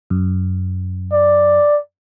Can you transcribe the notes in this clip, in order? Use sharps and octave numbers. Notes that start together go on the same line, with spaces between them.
F#2
D5